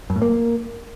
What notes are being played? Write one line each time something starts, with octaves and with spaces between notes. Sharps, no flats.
F#2
A2
A#3